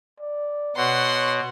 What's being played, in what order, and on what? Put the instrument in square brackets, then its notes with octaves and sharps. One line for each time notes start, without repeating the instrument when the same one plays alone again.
[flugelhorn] D5
[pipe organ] B2 [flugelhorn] C#5 [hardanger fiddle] F#5 C6